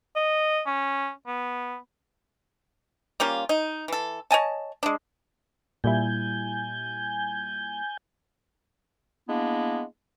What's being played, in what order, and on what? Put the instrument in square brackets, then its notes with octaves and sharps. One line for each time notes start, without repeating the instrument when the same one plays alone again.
[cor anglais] D#5
C#4
B3
[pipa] G3 A#3 C#4 F4
D#4
E3 A4
C#5 D#5 G#5 A5
G#3 D4
[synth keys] A#2 G3 E4 [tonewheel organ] G#5 G6
[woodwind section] G#3 A#3 B3 D4 E4